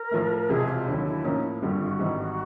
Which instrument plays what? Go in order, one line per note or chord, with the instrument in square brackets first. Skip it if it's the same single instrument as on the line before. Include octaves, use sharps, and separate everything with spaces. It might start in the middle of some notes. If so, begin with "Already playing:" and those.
Already playing: [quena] A#4
[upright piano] A2 F3 A3
[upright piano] E1 E2 C3 F3 G#3 [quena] G#4
[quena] F4
[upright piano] D#2 D3 F#3 [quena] E4
[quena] E4
[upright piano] A2 F3 A#3 C#4 [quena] D#4
[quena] E4
[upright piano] G#1 G2 D3 G3 [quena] F4
[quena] F#4
F4
F#4
[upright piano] G#1 G#2 E3 G3